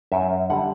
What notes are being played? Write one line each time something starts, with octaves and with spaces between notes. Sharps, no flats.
F#2 E5
D3 G3 F#5